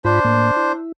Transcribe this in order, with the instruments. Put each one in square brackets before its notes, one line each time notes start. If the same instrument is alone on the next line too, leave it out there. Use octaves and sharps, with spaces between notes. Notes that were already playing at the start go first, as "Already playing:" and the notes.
[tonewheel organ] G#2 F4 B5 [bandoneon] D4 C5
[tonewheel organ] A2 A#3
E4